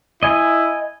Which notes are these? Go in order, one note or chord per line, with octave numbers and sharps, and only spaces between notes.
E4 D#5 G#5